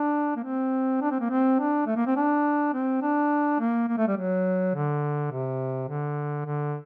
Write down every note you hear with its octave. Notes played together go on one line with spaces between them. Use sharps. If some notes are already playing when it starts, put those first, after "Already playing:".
Already playing: D4
A#3
C4
D4
C4
A#3
C4
D4
A3
A#3
C4
D4
C4
D4
A#3
A#3
A3
G3
F#3
D3
C3
D3
D3